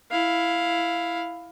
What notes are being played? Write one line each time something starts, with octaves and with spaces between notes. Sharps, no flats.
E4 F5